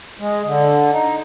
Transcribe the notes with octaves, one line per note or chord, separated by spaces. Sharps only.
G#3
D3
D#4